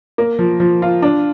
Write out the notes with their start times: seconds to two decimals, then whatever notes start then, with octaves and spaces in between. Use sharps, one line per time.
0.18 A#3
0.39 F3
0.60 F3
0.82 F4
1.02 D4